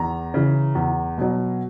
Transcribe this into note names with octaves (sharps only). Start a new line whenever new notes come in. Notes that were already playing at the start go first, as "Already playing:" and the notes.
Already playing: E2 A#5
C#3 E3
E2
B2 F#3